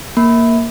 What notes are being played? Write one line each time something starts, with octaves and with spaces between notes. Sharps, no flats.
A#3